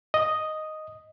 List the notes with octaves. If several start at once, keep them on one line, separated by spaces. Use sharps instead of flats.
D#5